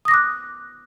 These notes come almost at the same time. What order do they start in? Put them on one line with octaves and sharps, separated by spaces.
D#6 A#6 D6 F#6